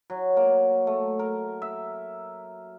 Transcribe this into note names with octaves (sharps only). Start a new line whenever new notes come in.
F#3
A#3
A3
A#4
E5